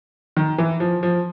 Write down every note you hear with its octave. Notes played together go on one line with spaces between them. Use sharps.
D#3
E3
F3
F3